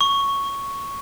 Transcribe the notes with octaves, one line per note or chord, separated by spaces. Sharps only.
C#6